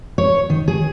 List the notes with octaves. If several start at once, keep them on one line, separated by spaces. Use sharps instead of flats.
C#5
D#3
G#4